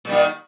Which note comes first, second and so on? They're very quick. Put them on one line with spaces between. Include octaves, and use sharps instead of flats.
A#2 G3 D#3